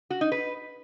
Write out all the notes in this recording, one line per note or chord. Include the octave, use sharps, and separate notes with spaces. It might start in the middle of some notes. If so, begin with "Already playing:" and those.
F#4
D#4
B4